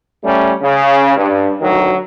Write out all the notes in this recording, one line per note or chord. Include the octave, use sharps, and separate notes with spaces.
G3 A3 C#4
C#3
G2
D2 D#3 F#3